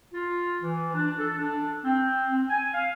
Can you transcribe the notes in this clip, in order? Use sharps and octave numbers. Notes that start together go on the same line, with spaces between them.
F4
E3
D4
A4
D4
C4
C4
G#5
F5